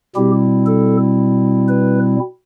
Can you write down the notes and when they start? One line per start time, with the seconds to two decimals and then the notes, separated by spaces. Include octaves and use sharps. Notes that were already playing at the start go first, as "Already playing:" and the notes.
0.16 B2 G3 C4 E4 G4
0.66 A4
1.69 B4